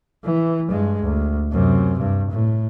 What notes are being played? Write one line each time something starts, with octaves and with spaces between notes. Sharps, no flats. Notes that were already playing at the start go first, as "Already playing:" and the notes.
E3
G2 G#3
D2
F#2 C3
G2
A2